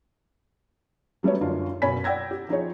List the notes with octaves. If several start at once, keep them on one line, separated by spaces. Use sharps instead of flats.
F#3 G3 A3 B3 C#5
F#2 D3 D4 D#4 F4
F#2 B2 C#5 G#5 B5 B6
D5 F#5 G5 E6 G#6 A#6
G4
F3 D#4 G#4 C#5